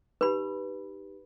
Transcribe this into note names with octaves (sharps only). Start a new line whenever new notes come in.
D#4 G4 B4 B5